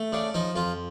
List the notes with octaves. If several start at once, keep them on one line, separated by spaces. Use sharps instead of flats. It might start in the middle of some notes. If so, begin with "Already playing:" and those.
Already playing: A3
C#3 D4
F3 D#4
F2 F4